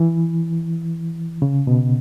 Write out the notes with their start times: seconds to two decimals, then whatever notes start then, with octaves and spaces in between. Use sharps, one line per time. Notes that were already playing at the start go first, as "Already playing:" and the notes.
Already playing: E3
1.42 C#3
1.67 B2